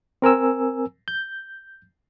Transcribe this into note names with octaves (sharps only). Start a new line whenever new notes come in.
C4 A#4 G#5 E6
G6